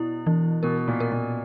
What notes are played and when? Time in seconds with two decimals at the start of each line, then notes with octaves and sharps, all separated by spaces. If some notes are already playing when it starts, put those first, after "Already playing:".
Already playing: B2 E4
0.27 E3
0.63 B2 A#4
0.88 A#2
1.00 A#4
1.12 A#2